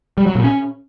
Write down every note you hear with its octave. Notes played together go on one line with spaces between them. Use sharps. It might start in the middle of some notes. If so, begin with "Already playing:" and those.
G3
F#3
A#2
C#4